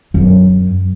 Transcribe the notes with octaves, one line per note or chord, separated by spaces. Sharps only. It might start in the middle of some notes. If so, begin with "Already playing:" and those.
F#2